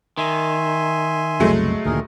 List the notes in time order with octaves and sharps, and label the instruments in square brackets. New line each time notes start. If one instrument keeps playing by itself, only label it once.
[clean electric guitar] D#3 [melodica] E5 G#5 C6
[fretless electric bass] F#1 C2 [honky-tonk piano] F#3 G#3 A3
[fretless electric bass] D2 A#2 D#3 [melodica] G#4 A#4